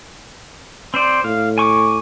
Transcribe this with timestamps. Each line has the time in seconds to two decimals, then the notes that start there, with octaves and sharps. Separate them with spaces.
0.94 C4 C5 D5
1.24 A2 F5
1.58 G#5 C#6 D6